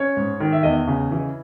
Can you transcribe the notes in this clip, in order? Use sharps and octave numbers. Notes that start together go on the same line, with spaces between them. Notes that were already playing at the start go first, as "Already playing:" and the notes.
Already playing: C#4 C#5
G#2
D#3
E5
E2 D#5
C#3
E3